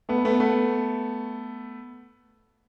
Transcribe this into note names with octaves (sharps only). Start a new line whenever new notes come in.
A3 B3
A3 B3
A3 B3